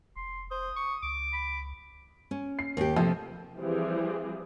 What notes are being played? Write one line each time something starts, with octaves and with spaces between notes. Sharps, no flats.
F1 C6
C5 D#6
C#6
C#2 D6
B5
C#4
C7
D#2 G4
C3 F3 A3
E3 F3 G3 C4 G4 G#4